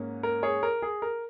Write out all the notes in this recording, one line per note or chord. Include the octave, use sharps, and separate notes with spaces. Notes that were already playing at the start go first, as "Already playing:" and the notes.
Already playing: G#2 A#3 C#4
A#4
G#4 C#5
A#4
G#4
A#4